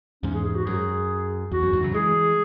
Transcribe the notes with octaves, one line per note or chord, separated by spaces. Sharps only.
E2 G#2 C#4
G#4
G#4
F#4
F#2 G#4
E2 F#4
F#2
E2 G#2
C#3 F#3
E3 G#3 G#4